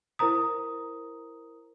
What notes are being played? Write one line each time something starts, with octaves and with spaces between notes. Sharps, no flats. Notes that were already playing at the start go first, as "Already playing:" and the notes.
E4 A#4 C5 A#5 D#6